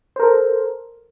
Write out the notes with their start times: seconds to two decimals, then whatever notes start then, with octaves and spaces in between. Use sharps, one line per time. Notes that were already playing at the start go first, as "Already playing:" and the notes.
0.16 C5
0.20 A#4
0.23 A4